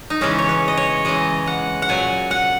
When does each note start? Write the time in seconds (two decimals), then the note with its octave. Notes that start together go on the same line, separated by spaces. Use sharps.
0.10 D#4
0.21 C#3 E3 G#3 C#4
0.39 C#5
0.49 B4
0.68 D#5
0.77 C#5
1.05 C#3 E3 G#3 D#5
1.47 F#5
1.82 F#5
1.89 A#2 F#3 G#5
2.31 F#5